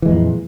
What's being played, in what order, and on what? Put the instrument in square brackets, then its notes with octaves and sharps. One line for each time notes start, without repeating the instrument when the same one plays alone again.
[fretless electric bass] E3
G#3
F2
A#2